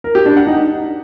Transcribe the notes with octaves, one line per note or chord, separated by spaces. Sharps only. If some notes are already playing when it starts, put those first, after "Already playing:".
A#4
G4
D4
F#5
D#4